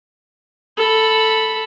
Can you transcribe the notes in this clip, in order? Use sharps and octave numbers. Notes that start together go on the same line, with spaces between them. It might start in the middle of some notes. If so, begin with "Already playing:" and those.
A4 B5